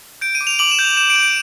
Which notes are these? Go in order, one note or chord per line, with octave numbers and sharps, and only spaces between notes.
G6 D7
D#7
D6
F7
D6 F#7
E7
G6
F7
G6 E7
D7
G6
D7